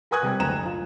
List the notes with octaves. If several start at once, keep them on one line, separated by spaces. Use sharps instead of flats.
A#4 B4 G#5 D#6 F#6 G#6
C3 G3 C4
F#1 D2 A#5 E7
F4